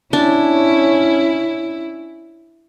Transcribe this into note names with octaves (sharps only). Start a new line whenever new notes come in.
C#4 D4 E4